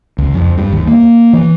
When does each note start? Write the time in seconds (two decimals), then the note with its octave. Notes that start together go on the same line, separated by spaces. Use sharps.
0.18 C#2
0.34 F2
0.58 G2
0.72 D#2
0.88 A#3
1.33 E3